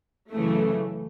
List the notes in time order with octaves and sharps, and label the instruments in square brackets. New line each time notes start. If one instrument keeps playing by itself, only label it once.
[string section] F#2 C#3 E3 A3